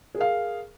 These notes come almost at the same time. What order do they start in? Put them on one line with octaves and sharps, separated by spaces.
G#4 A#4 F5